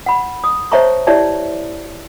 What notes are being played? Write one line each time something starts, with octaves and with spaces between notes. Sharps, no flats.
F#5 B5
D#6
C5 C#5 E5 A5 A#5 C#6
E4 G4 C#5 D5 E5 A5